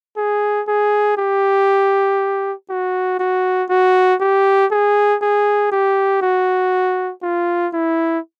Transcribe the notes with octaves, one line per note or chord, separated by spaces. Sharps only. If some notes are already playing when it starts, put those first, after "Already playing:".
G#4
G#4
G4
F#4
F#4
F#4
G4
G#4
G#4
G4
F#4
F4
E4